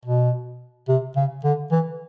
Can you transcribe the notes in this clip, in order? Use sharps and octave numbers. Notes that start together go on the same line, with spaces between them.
B2
C3
C#3
D3
E3